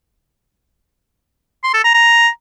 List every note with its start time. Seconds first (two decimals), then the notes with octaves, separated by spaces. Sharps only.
1.64 C6
1.74 A4
1.84 A#5
1.94 A#5